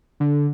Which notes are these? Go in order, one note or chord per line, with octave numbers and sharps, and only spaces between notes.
D3